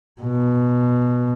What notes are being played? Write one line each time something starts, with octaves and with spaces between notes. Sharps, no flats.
B2